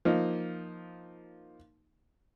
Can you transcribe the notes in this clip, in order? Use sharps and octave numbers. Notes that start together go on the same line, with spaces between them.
F3 A#3 D#4